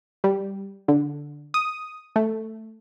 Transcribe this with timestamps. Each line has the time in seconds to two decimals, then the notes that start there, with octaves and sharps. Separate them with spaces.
0.24 G3
0.88 D3
1.54 D#6
2.16 A3